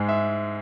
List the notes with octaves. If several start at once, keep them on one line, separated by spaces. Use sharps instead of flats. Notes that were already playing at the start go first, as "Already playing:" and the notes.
Already playing: G#2 G#3
E5